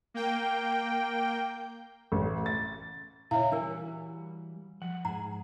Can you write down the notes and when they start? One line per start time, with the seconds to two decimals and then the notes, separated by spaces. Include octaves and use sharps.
0.14 A#3 G5
2.12 A1
2.46 A6
3.31 A#2 C#3 E4 C#5 E5 F5
3.52 E3 G3 D4 F#4 A#4 G#5
4.82 F3 F#5
5.05 G#2 G#4 F#5 A#5